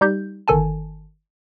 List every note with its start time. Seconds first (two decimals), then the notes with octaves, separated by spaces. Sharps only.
0.01 G3 D#4 G4 G6
0.48 G1 D#3 A4 G#5 A5